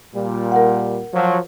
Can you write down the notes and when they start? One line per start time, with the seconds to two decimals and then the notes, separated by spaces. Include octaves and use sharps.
0.14 A#2 G3
0.52 A#4 F#5
1.14 F3 F#3